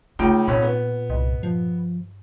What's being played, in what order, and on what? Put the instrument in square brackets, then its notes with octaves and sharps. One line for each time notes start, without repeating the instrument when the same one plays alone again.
[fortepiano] C#2 D#4 G5 [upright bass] A3 [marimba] F4
[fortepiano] G#1 C#4 B5 [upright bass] A#2
[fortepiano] B3
[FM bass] C2 [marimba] G2 D#5
[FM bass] F3